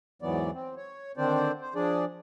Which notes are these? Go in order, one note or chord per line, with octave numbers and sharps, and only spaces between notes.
E2 G#2 E3 F#3 B3 D5
C4
C#5
D3 D#3 C4 D4 C5 D5
C5
F3 D4 G#4 D5